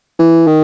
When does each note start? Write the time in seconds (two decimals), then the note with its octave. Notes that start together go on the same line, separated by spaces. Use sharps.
0.19 E3
0.47 D#3